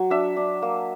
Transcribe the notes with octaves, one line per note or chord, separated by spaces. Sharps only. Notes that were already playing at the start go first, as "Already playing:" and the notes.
Already playing: F#3
D4 E5
D4
A#3